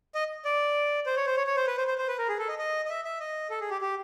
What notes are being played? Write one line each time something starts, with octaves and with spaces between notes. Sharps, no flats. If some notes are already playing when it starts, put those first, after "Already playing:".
D#5
D5
C5
C#5
C5
C#5
C#5
C5
B4
C5
C5
C5
B4
A#4
G#4
A4
D#5
D#5
D#5
E5
E5
D#5
A4
G#4
G4
G4